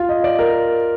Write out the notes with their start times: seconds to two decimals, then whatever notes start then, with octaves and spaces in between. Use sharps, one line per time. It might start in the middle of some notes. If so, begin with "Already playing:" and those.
Already playing: F4
0.09 D#5
0.24 D5
0.39 A#4